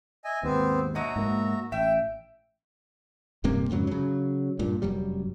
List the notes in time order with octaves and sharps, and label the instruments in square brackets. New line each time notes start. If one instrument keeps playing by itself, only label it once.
[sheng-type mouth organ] D#5 E5 G#5
[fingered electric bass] D#2 G#2 [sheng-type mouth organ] B3 C4
[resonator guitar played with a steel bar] B2 F#3 D#5 [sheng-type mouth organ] F#4 E5 A#5
[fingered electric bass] G#2 A#3
[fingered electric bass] A1 [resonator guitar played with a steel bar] E5 [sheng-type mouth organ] G5
[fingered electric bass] D#1 G2 C3 A#3
F2 G#2 C#3 F#3
C#3 F#3
G2 A#2
F1 F#2 F#3 G3